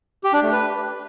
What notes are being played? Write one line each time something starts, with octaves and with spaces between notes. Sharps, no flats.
G4
D4
A3
B4